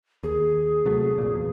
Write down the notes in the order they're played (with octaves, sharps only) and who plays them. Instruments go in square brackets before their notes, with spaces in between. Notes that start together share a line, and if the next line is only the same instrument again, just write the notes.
[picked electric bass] D#2 [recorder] G#4
[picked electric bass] C3 F#3 A3
A#1 A#2
E2